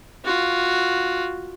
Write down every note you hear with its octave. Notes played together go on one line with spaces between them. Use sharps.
F4 F#4